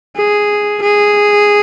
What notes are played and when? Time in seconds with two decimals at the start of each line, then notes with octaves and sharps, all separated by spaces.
0.17 G#4
0.83 G#4